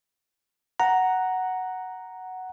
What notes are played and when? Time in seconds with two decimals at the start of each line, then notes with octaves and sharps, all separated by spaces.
0.80 F#5 A#5